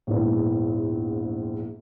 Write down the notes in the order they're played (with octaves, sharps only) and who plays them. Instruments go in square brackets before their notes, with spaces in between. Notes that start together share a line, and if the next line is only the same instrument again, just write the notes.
[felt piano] A#1 E2 G#2